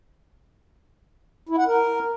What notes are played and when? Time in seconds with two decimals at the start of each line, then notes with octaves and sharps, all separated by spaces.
1.49 E4
1.58 F#5
1.67 A#4